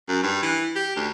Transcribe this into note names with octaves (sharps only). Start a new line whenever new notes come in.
F#2
G2
E3
G4
D2